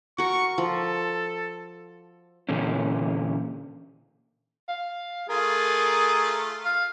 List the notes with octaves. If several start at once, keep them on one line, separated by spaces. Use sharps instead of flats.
F#4 A#4 C#6
F3 A4
A#2 D3 E3 C#4
F5
A3 F4 G#4 A#4
F5